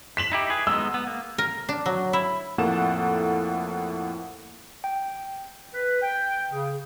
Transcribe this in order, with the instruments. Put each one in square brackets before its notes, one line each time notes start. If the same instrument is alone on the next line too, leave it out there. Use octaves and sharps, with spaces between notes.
[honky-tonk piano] B6 E7 F#7
[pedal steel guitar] D#4 E4 G4
G#4 B4
[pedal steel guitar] G#3 B3 D#4 [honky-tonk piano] E6
[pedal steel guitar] B3
A#3
[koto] A#4
D4
F#3
E4
[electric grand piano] F2 A2 A#3 A4 F#5 E7
[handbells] G5
[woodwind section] B4
G5
C#3